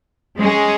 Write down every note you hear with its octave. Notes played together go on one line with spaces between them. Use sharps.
G#3 C#4 G#4